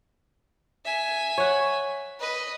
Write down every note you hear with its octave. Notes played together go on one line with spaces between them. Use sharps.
E5 G#5
C#5 F#5
B4 D#5